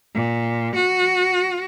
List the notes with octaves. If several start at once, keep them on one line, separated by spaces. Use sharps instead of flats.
A#2
F#4